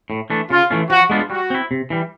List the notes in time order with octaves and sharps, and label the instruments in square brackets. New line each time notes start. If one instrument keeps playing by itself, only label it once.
[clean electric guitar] A2
E3 A3 D4
[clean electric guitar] C#3 [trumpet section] F4
[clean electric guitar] E3 A3 C#4 F4
[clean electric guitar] F3 [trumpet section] F#4
[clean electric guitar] G#3 B3 D4 F4
[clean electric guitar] G3 [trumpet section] F#4
[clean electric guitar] C4 E4
C3
E3 G3